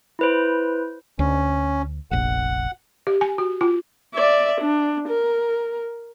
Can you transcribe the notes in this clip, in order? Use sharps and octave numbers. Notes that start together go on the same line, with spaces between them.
E4 B4 C5
D2 C#4
F1 A#1 F#5
G4
G#5
F#4
F4
D5 E5
D4
A#4